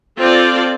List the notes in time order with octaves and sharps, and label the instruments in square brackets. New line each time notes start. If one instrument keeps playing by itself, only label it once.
[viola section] C4 F4 A4 D5